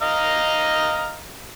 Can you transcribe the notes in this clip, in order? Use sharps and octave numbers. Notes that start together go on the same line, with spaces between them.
D#5 F5 A#5